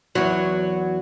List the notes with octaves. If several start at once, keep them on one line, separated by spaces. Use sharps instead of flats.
E2 F#3